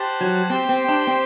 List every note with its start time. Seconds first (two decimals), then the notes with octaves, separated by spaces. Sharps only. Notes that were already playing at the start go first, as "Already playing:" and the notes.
Already playing: G4 C5 F#5 A5
0.21 F#3
0.50 C4 G4 C5 G5
0.69 C4
0.89 D4
1.07 C4